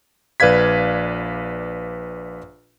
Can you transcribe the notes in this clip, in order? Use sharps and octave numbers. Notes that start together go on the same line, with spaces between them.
A#1 B4 D5 F5 G#6 B6